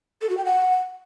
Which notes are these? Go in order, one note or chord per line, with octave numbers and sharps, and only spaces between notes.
A4
F#4
G5
F#5